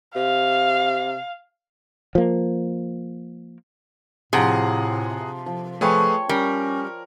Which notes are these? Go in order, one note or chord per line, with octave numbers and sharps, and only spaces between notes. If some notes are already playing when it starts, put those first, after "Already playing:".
C3 F5
F3 A#3
A2 C3 F3 F4 G#4 F#5 A#5
F3
F3 A3 G#4 B4 C#5 G5 C#6
G3 C#4 A#4